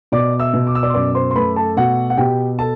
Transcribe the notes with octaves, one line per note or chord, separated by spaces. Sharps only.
B2 D5 D6
E5 E6
B2
D6
E6
D5 D6
C6
F#2 D5 D6
C5 C6
C6
A3 B4 B5
A4 A5
B2 F#4 F#5
F#5
B2 G4 G5
A4 A5